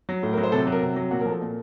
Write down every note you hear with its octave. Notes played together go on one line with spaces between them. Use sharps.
F#3
A2
A#4
F#3
C5
C3 A4
F#3
A#4
C3
F#3
A#2 F#4
A#4
F3
A4
A#2